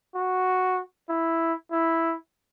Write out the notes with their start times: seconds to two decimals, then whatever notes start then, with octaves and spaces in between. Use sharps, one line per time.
0.15 F#4
1.10 E4
1.72 E4